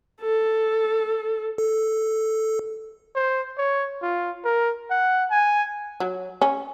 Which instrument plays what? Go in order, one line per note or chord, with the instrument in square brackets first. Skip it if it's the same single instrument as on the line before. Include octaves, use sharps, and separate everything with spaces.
[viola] A4
[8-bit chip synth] A4
[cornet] C5
C#5
F4
A#4
F#5
G#5
[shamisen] F#3
C#4